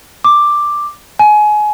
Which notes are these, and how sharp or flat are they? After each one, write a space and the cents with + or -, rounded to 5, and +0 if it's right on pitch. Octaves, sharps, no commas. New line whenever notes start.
D6 +5
G#5 +25